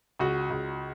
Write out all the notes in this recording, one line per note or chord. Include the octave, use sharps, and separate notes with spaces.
C#2 F#4
C#2